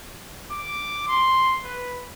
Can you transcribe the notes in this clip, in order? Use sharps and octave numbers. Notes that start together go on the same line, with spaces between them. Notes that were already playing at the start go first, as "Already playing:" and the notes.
D6
C6
B4